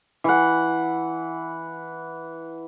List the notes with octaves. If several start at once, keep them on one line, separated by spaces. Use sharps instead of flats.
E3 F#5